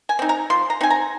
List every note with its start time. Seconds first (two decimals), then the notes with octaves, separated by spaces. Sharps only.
0.09 G#5
0.19 C4 D#4
0.29 A#5
0.50 F3 C6
0.70 A#5
0.81 C4 D#4 G#5
0.90 A#5